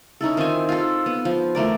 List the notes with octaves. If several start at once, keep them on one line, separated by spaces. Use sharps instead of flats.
C#4 D#4 E4 A4
D#3 C4 F4 G#5
F4 A4
B3
F3
E3 A3 A#4 D5